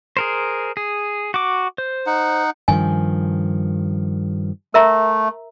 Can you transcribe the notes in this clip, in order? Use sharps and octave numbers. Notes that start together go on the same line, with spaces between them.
G#4 A#4 C5
G#4
F#4 D6
C5
D#4 F#5
G2 D#3 F3 G#5
A3 A#4 E5 A#5